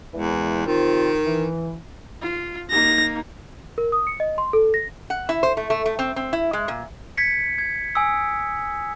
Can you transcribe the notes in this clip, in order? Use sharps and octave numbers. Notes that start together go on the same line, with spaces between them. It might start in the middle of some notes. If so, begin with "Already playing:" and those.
E2 A#2 E3 G#3
C3 D#3 C4 F4
E3
F4
A#3 D#4 A#6
A#4
D#6
C#7
D#5
C6
A4
A#6
F#5
E4
C5
A3
A3
A3
C4
C4
E4
G#3
A#2
G#6 B6 C#7
G#6
G#5 D#6 E6